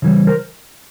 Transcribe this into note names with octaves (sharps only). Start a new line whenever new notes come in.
C#3 E3 G3
A#4 C5